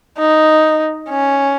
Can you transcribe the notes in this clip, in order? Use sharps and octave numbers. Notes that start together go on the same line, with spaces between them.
D#4
C#4